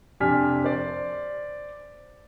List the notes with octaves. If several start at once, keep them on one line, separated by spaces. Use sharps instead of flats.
F2 C3 D4 G#5 F6 B6
C5 D5